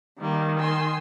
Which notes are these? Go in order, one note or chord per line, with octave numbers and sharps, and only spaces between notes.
D#3 G3 A#3
G#5 C6 E6